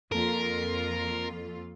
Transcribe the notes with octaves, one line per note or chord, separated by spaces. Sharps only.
F2 A#3 F4 A4 A#4